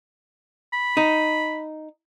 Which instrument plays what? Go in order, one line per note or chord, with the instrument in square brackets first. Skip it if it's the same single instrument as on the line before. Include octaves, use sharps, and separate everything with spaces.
[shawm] B5
[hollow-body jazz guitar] D#4